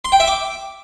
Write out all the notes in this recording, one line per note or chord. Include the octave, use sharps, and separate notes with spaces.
C6
G5
E5
D6